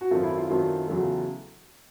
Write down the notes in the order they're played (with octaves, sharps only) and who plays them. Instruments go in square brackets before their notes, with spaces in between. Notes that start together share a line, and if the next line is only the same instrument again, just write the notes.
[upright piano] F#4
F#2 D#3 F#3 A3 C4 F4
E4
F4
F#2 D#3 F#3 A3 C4 F4
E2 C#3 F#3 A3